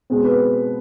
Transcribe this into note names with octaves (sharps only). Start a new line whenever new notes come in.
B2 G#3 C4
B4